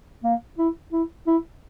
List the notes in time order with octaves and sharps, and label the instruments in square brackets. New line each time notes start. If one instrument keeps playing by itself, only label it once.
[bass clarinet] A#3
E4
E4
E4